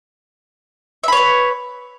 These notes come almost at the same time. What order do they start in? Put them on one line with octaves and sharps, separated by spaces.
E5 B5 C#5 B4